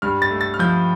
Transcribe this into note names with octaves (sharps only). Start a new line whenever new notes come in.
G2 F6
A6
A3
A6
F6
F3 G6